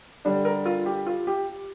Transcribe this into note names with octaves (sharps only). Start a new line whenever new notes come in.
D3 G3 D4
A#4
F4
G4
F4
G4